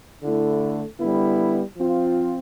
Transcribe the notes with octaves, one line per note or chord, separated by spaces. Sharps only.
D3 A3 E4
D3 G3 B3 E4
F3 C4 F4